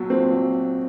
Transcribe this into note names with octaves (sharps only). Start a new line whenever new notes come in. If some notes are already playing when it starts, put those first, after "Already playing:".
Already playing: B1 A#2 F#3
A#2 C4
F#3